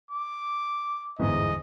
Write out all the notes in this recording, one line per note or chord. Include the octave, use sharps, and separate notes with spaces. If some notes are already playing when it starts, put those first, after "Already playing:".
D6
G1 E2 G#2 D#5